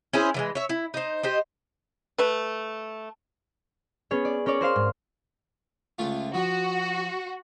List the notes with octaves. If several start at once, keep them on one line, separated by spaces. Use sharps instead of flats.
C#4 E4 G#4 C5
E3 G3 G#3
C#5 E5
E4
D#4 C5
G4 C5 D#5
A3 B4
B3 C#4 G#4 C#5
D5
C#4 A#4 C#5 D5
A#4 C5 F5 C6
G#2
C#2 A3 F4
F3 F#4